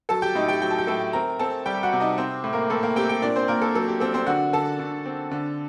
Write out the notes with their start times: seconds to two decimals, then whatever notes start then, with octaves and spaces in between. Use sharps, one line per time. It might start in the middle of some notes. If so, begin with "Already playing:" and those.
0.09 F#3 A4 A5
0.22 G4 G5
0.35 A2 D#4 D#5
0.48 G4 G5
0.62 F#3 G5
0.71 A5
0.78 G4 G5
0.87 A2 A4 A5
1.13 C4 A#4 A#5
1.39 C4 A4 A5
1.66 G3 G4 G5
1.83 F#4 F#5
1.93 C3
2.00 D#4 D#5
2.18 C4 C5
2.44 A2
2.53 A#3 A#4
2.70 A2 A4
2.83 A#3 A#4
2.96 C4 G4 G5
3.09 G4 G5
3.22 A#2 D4 D5
3.36 C4 C5
3.48 A#2 A#3 A#4
3.62 A4
3.75 F#3 A4
3.88 G4
4.00 C4 A4
4.14 C4 C5
4.27 D3 F#4 F#5
4.53 D3 A4 A5
4.79 D3
5.05 C4
5.31 D3